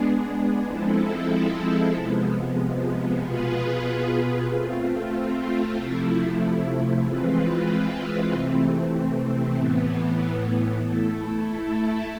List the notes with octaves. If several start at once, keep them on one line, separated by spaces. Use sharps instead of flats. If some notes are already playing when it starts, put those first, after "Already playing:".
Already playing: G#3 B3 D4 G#4
F3 G#3 C4 E4 A4
C3 F3 G#3 B3
B2 B3 F4 G#4 B4
A3 C4 F4
C3 F3 A3 E4
E3 G#3 C4 F4 B4
C3 E3 A3 C4
A2 E3 B3
A3 E4 A4